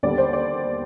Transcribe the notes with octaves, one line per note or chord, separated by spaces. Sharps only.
D#2 D3 G3 B3 D5
C5
D5